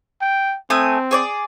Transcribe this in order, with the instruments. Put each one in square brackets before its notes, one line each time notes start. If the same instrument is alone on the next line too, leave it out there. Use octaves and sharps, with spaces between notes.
[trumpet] G5
[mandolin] A3 G#5 D#6 [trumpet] C4
[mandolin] G#4 C#5 D5